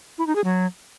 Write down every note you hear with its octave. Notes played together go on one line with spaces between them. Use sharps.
E4
D#4
G#4
F#3